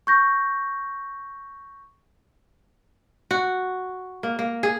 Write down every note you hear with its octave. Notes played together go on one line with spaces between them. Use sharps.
C#6 G6 A#6
F#4
A#3
A#3
G#4